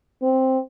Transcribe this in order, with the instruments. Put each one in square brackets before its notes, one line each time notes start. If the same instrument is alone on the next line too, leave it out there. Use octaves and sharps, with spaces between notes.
[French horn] C4